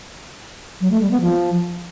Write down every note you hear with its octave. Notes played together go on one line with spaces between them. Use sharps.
F#3
A3
G3
B3
F3